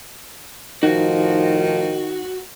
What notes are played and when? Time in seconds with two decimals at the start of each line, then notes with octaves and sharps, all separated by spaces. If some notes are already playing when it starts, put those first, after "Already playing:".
0.83 A2 D#3 F3 D#4 F#4